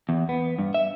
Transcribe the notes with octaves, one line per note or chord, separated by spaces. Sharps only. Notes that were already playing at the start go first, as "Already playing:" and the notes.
E2
B3
G2
E5